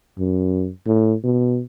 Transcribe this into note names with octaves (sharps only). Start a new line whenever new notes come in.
F#2
A2
B2